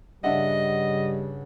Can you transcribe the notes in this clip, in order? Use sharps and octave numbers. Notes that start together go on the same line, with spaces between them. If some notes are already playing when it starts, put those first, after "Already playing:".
G2 C#3 G3 D4 D#5 E5 F#5